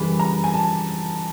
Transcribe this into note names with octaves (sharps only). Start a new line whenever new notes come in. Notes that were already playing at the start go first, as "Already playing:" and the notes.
Already playing: F#2 C#3 E3 G3 B5
A#5
G#5
A5